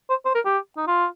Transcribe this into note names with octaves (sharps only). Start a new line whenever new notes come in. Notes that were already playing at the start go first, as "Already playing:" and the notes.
C5
C5
A#4
G4
D#4
F4